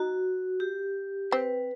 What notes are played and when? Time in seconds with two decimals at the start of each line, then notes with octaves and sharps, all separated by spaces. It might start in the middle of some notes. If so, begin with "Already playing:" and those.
Already playing: D#4 F#4
0.60 G4
1.31 C4 B4